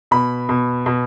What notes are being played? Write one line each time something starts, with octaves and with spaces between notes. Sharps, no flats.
B2 B5
B2
B2